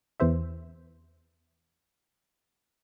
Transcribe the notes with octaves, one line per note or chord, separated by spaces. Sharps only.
E2 E3 C5 E5